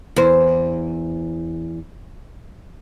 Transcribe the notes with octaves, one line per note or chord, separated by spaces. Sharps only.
E2 C5